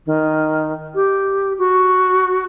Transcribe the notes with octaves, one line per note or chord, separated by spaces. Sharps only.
D#3
G4
F#4